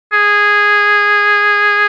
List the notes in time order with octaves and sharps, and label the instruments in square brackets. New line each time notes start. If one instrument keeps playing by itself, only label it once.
[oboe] G#4